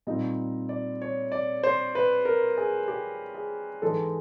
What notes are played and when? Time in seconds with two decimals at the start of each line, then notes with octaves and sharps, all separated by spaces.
0.07 A#2 G3 C4 D#4 D#5
0.69 D5
1.02 C#5
1.32 D5
1.63 C5
1.95 B4
2.25 A#4
2.57 G#4
2.88 G4
3.35 G#4
3.82 G#2 E3 G#3 A4